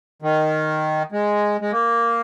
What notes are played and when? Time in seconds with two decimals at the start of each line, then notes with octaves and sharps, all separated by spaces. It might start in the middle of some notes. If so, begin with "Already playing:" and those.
0.22 D#3
1.12 G#3
1.61 G#3
1.72 A#3